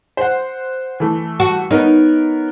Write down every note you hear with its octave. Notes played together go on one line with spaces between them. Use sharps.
C5 F#5
E3 A3
F#4
B3 D#4 A#4 C#5